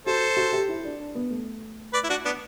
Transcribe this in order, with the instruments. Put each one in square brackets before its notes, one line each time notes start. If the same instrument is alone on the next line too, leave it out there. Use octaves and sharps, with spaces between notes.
[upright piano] F#4 [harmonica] A4 C5
[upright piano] F#4
G4
E4
D4
D4
B3
A3
[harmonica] B4 D5
E4
D4 F#4
B3 D4